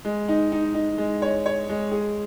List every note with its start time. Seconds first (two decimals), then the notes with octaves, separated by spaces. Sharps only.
0.05 G#3
0.28 D#4
0.52 D#4
0.74 D#4
0.98 G#3
1.22 C#5
1.46 C#5
1.69 G#3
1.92 G#4